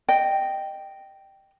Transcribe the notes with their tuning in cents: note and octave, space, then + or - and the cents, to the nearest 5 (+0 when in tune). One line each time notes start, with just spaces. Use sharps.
D#5 -15 G5 -5